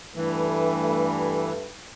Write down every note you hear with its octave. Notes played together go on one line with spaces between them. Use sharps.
G2 E3 A3 B4